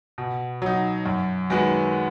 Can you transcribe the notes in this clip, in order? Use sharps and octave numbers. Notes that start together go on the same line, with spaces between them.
B2
F#3 D#4
F#2
D#3 G#3 B3 F#4